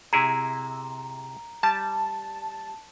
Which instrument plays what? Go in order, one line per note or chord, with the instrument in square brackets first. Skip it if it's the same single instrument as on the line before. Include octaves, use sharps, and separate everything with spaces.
[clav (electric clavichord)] C3 E4 G#4 [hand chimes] A#5
[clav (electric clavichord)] G3 [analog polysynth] A5